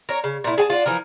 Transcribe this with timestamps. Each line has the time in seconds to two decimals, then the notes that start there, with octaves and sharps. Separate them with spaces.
0.09 A#4 C#5
0.24 C#3
0.44 A#2 E4
0.58 G#4 G#5 A5
0.70 D4 F4
0.86 E3 F3 A#4